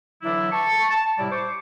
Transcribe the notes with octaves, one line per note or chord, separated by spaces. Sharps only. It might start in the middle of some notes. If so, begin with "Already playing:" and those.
D3 E3 F#3 D4 E4
A5 C#6
A5
A2 C3 G3 E4 D5
C5 C#6 D6